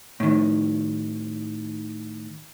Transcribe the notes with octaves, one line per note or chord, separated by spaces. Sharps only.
A2 D#3